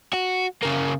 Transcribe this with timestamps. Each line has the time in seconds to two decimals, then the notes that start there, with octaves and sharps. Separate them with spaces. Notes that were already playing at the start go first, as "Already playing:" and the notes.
0.13 F#4
0.63 C#3 A#3